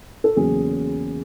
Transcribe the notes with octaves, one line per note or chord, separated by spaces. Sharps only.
A4
E2 C#3 F#3 A#3 C#4 G#4